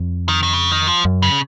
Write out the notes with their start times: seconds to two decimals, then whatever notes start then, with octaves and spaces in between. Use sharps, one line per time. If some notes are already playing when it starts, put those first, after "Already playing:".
Already playing: F2
0.29 D#3
0.43 D#3
0.53 C#3
0.71 D#3
0.87 F3
1.05 F#2
1.22 C#3